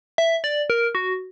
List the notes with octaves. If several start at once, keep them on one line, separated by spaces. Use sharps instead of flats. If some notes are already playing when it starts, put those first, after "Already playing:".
E5
D5
A#4
F#4